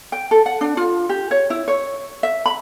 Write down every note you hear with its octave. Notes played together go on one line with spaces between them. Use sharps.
G5
A4
F#5
D4
F4
G4
C#5
E4
C#5
E5
B5